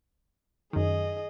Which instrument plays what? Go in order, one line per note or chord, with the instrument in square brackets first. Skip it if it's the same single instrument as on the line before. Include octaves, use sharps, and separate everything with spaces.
[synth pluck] F#2 D#3 [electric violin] G#4 D#5